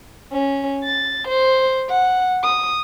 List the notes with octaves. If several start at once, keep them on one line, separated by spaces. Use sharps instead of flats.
C#4
A6
C5
F#5
D#6